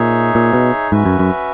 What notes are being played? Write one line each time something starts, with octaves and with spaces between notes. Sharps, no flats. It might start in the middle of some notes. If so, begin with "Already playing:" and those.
Already playing: A#2 D#4 G#4 C#5 E5
A#2
B2
G#2 C#4 F#4 B4 E5
F#2
F#2